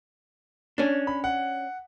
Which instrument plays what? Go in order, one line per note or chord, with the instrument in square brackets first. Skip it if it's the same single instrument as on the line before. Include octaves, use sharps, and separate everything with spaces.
[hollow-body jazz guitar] C#4 D4
[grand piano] B5
F#5